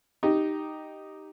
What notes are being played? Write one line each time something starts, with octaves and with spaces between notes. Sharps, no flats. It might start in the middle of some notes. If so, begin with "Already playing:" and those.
D#4 G4